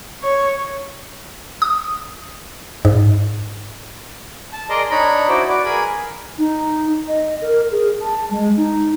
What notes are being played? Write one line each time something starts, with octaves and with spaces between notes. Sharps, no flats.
C#5
D#6
G#2
A5
G#4 A#4 D5 D#5 A#5 C6
D4 D#4 C#5 A#5 B5
E4 F#4 C5 D5
F#4 B4 D5 D6
G#4 A#4 G#5 B5
D#4
D#5
A#4
G#4
A5
G#3
D#4